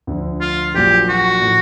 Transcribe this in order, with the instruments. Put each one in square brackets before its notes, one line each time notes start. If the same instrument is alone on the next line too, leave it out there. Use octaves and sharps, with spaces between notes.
[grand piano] D2 D3 F3
[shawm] F4
[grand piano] A#1 A#2 F#3 [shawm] G4
[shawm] F#4
[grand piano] A2 F3 A3